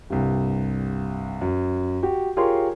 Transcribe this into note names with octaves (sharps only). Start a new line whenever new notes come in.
C2 G2
F#2
F#4 G4
F4 G4 G#4 A#4 C#5 C6